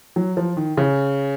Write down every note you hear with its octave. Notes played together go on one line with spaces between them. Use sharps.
F#3
F3
D#3
C#3